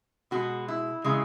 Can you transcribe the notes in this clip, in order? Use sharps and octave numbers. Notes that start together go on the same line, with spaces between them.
B2 G#3 F#4
E4
C#3 E3 G#3